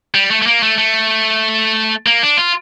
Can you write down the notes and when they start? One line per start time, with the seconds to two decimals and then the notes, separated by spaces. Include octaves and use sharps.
0.14 G3
0.31 A3
0.42 A3
0.46 A#3
0.63 A3
0.78 A3
2.06 A#3
2.23 D4
2.37 F4